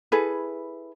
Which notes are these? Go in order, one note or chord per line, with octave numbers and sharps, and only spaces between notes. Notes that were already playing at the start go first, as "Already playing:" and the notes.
E4 G#4 A4 B4